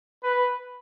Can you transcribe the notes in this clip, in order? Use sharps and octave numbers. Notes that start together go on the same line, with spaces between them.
B4